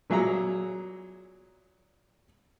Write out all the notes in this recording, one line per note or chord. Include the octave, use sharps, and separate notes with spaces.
A#2 F#3 G#4 E5 A#5